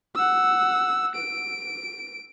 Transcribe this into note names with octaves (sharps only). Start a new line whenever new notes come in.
F#5 E6
D7